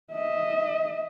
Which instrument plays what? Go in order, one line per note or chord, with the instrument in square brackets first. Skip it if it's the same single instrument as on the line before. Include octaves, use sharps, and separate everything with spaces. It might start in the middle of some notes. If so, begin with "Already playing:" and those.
[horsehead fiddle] D#5 E5